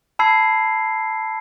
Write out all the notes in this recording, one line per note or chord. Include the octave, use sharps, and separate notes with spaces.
A5 B5 E6 G#6 C7